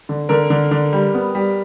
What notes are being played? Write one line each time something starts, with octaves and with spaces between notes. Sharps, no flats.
D3
D3 A#4
D3
D3
G3
B3
G3